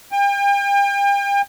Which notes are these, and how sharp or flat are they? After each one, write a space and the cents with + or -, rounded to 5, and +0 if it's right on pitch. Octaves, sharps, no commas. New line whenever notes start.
G5 +40